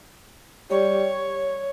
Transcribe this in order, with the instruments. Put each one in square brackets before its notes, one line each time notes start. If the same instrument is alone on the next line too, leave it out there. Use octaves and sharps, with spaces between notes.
[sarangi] G3 [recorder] C#5